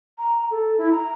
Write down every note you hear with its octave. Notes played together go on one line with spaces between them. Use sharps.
A#5
A4
E4
A#5